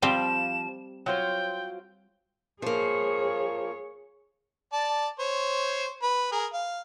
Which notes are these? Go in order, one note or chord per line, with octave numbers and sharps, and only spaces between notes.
F3 G3 C4 G4 E7
F#3 F4 C5 G5
F3 A#3 G#4 C#5
D5 A5
C5 C#5
B4
G#4 A#4
F5